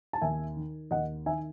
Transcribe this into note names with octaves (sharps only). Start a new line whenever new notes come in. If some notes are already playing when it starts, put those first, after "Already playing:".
A5
D#2 E5 G#5
D#3
D#2 D#5 F#5
D#3 E5 G#5